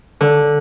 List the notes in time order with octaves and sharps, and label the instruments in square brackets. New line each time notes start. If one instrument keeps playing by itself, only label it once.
[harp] D3